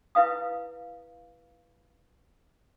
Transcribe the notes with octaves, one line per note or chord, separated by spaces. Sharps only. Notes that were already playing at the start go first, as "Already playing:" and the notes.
E4 B4 F5 D#6